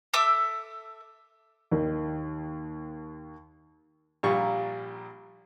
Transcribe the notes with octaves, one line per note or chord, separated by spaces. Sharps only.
A4 E5 D6 E6
D#2 D#3
A#1 A#2 G3 F4 C#6